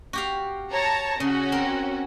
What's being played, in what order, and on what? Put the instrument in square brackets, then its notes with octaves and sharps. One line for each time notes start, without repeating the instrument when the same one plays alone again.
[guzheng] F#4 G4 F5
[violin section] C#5 A5 A#5
[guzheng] C#3 [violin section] C#4 F#4
[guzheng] C4 A#4